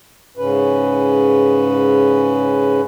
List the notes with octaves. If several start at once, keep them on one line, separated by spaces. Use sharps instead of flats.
G#2 C#3 C#4 B4